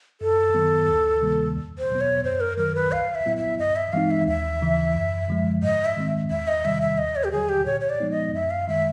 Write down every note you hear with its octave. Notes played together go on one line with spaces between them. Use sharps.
F#2 A4
D#3 F#3 B3
D2
C3 D#3 G3 A#3
E2
C5
B2 F#3 B3
C#5
F#2 C5
A#4
D#3 F#3 A#4
B4
B1 F5
E5
A#2 F#3 B3 E4
E5
G2 D#5
E5
E3 G#3 C4 D#4 F5
E5
D#2 E5
C#3 E3
F#2
D3 F3 G#3
G#2 D#5
E5
D#3 G#3 C4
E2 E5
D#5
C3 D#3 G3 E5
E5
D#2 D#5
C#5
G4
D3 F#3 G#4
G4
A#2 C#5
C#5
D5
F3 G#3 B3 D#4
D#5
F#2 E5
F5
D#3 G#3 E5